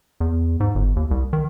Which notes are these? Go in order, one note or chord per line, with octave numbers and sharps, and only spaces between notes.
E2
G#2
G1
D#2
C2
D#3